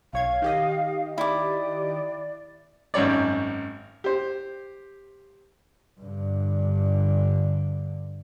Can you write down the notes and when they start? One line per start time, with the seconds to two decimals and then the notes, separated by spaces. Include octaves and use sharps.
0.13 B1 C#5 F5 G#6
0.42 D#3 G4 D#5
1.18 E4 D5 D6
2.94 G#1 F#2 C#5 D5
4.04 G4 C5
6.00 G2 D3